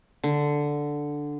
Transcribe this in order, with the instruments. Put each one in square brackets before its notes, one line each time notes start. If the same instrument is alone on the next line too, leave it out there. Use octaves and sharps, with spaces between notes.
[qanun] D3